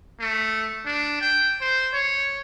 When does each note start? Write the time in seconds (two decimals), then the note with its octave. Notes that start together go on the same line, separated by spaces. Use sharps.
0.20 A3
0.85 D4
1.21 G5
1.61 C5
1.94 C#5